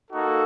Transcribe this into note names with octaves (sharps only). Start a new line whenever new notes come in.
A#3 D#4 F#4 A4